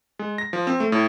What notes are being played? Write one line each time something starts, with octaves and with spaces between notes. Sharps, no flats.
G#3
A#6
F3
C4
A3
A2